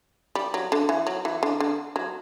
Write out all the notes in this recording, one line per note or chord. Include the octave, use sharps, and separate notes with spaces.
G3
F#3
D3
E3
F#3
E3
D3
D3
F#3